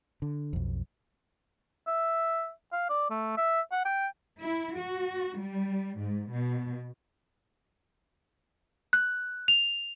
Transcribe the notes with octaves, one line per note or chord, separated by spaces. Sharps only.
D3
B1 F2
E5
F5
D5
A3
E5
F#5
G5
E4
F#4
G3
G#2
B2
F#6
F7